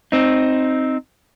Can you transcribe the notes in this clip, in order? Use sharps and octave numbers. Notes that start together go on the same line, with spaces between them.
C4 D#4